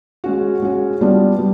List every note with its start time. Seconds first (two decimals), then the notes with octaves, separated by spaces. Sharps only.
0.24 G#3 C#4 F#4
0.62 G#3 C#4 F#4
1.01 G3 B3 D4 F4
1.39 G3